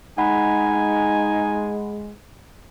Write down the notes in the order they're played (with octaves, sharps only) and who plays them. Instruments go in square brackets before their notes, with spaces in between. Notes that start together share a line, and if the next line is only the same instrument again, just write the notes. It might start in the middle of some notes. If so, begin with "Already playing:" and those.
[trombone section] G#3 [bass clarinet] D#4 [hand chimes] F#5 B5 [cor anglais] G#5